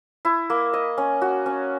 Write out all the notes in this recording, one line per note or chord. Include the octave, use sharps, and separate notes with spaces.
E4
A#3
D#5
C#4
F#4
C#4